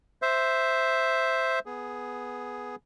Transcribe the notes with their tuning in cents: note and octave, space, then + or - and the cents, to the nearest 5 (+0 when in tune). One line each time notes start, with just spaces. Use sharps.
C5 +0 E5 +0
B3 +0 G#4 +5